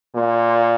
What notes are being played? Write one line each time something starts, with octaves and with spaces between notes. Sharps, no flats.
A#2